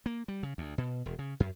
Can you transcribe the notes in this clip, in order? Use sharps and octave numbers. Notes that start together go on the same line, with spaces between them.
A#3
G3
C#3
D2
B2
E1
C#3
F#2